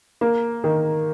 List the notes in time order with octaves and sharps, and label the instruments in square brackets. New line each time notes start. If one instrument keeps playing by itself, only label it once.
[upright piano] A#3
D#3